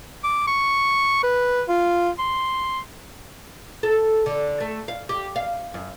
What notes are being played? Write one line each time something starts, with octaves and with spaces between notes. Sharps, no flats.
D6
C#6
B4
F4
C6
A4
D3
A3
F5
G4
F5
F#2